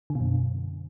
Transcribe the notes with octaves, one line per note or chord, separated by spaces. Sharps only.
D3
B2
F#2